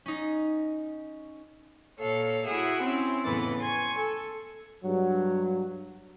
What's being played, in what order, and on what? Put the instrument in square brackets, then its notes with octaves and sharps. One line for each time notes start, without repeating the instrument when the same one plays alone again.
[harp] C#4 D#4
[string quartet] A#2 A4 C#5 F5
E4 F#4 G#4 E5 F#5
C4 C#4 E4
F2 A2 C#3 E3 B3 A6
G#5 C6 C#6 G#6
A4
[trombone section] G2 F#3